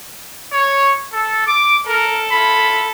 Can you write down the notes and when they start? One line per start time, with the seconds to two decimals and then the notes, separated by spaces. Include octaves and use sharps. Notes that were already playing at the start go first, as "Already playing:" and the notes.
0.52 C#5
1.13 A4
1.46 D6
1.87 A4 A#4
2.31 E4 F4 B5